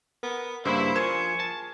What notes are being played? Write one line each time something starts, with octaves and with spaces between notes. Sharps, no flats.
B3 A#4
G2 C#3 A#3 E4 C5
F3 G#4 A#4 G#5 C#6 G#6 E7
A5